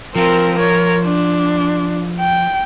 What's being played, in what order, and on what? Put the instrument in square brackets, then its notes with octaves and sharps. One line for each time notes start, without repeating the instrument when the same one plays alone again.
[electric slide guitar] F3 F4 [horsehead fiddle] C4 A#4
[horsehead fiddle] A#4 C#5
D4
G5